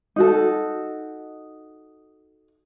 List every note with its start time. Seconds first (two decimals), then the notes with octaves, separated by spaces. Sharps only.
0.16 D#4 F#4 A4